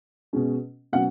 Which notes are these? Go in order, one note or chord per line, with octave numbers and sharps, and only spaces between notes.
B2 G#3 C#4
B2 F#3 C#4 F#5